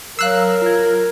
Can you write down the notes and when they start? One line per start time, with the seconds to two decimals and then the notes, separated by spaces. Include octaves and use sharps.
0.19 F#3 A#4 F5 E6 F#6 C7
0.62 F4 G#6